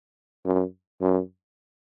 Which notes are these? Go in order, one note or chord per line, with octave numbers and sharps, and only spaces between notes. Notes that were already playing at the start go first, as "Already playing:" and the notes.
F#2
F#2